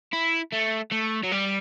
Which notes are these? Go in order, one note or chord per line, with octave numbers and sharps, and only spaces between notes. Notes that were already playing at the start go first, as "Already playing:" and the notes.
E4
A3
A3
F#3
G3